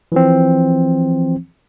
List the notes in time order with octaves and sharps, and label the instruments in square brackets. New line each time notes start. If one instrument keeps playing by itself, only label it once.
[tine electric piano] E3 F3 C4